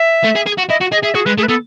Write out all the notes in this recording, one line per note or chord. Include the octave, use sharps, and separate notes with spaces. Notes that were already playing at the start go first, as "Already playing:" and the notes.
Already playing: E5
A3
G#4
G#4
F#4
E4 D#5
F#4
G#4 D#5
G#4 E5
F#4 G#4
G#3 B4
A3 G#4
B4
B3 A4